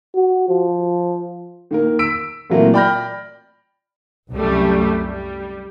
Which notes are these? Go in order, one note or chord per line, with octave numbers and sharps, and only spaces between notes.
F#4
F3
D#3 A#3 A#4
E6 B6 D7
A#2 E3 F#3 A3 A#3 C4
D5 G5 B5 F6 G6 A#6
C2 F#2 G3 A3
G3